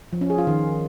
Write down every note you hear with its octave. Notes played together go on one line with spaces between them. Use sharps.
F3
C#4
G#4
F4
D#3